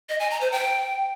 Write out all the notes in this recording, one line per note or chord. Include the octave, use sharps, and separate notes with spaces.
D#5
G#5
A#5
C5
G5